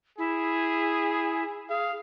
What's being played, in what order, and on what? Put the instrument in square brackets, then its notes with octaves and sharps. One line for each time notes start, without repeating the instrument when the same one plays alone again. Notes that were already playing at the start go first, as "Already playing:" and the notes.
[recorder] E4 [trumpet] G#4
[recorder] G#4 [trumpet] F5